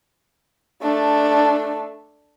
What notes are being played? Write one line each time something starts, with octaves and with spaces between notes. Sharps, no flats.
A3 D4